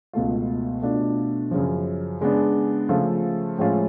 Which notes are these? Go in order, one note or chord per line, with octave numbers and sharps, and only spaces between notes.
C#2 B2 A3 F4
B2 A3 D4 F4
F#2 C#3 F3
C#3 G#3 B3 D4
C#3 F3 A3 F4
A2 F3 G#3 C#4 F4